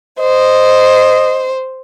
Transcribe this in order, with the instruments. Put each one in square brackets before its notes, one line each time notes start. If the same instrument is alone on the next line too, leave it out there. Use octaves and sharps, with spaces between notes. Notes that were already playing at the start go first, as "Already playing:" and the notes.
[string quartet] C5 [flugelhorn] D#5